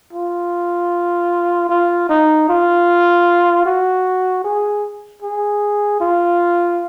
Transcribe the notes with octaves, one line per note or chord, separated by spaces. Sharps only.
F4
F4
D#4
F4
F#4
G#4
G#4
F4